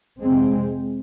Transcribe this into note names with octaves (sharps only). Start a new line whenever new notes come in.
F2 C3 G#3 C4